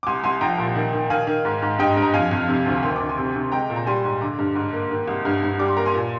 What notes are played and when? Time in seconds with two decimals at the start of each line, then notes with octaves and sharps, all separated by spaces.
0.03 D6
0.07 C2 G#5 C6
0.23 C2 G#5 C6
0.41 F3 G5 A#5
0.58 A#2
0.76 D#3
0.93 D#3
1.10 D#3 F5 G#5
1.27 D#3
1.45 G#2
1.62 G#2
1.79 G2 D#5 G5
1.97 G2
2.02 A#5
2.14 F2 F5 G#5
2.31 F2
2.49 C3
2.66 D2
2.83 D#3 C6
2.96 D2 D6
3.09 G#5 C6
3.18 C3
3.36 C3
3.52 G#3 G5 A#5
3.70 A#2
3.76 A#5
3.86 G3 G#5 C6
4.04 G#2
4.10 C6
4.21 D3 A#5 D6
4.39 G2
4.55 G#2
4.73 A#3
4.91 D#3
5.08 C2
5.25 G2
5.43 G2
5.59 G3 D6
5.68 C6
5.77 A#3 A#5
5.86 G#5 C6
5.94 A#2